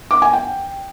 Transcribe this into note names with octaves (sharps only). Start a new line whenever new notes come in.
D6
G#5
G5